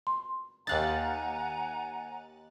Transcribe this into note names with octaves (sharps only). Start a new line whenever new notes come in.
C6
D#2 D#4 F5 F#5 G#5 A#5 F#6 A6